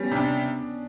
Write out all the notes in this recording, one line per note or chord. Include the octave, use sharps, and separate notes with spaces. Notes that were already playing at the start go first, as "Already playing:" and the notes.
Already playing: G3 B3 C#4
C3 D4